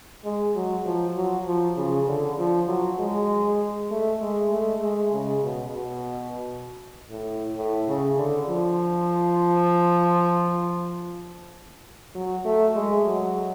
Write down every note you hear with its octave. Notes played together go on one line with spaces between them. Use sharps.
G#3
F#3
F3
F#3
F3
C#3
D3
F3
F#3
G#3
A3
G#3
A3
G#3
C#3
B2
B2
A2
A2
C#3
D3
F3
F#3
A3
G#3
F#3